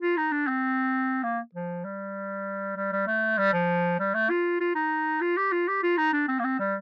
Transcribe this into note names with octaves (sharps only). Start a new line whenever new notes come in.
F4
D#4
D4
C4
A#3
F3
G3
G3
G3
A3
G3
F3
G3
A3
F4
F4
D#4
F4
G4
F4
G4
F4
D#4
D4
C4
A#3
C4
G3